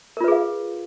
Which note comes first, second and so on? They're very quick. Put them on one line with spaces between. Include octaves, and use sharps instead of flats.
A#4 F4 B4 G#4 F5